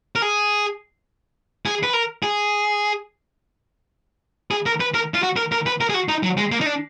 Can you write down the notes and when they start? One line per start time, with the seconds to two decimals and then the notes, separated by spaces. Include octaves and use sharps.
0.16 A#4
0.22 G#4
1.66 G#4
1.83 B4
1.93 A#4
2.23 G#4
4.51 G#4
4.66 A#4
4.81 B4
4.94 A#4
5.14 F4
5.23 F#4
5.37 A#4
5.52 A#4
5.66 B4
5.81 A#4
5.89 G#4
5.94 F#4
6.09 D#4
6.23 F#3
6.37 G#3
6.52 A#3
6.61 D#4
6.66 D4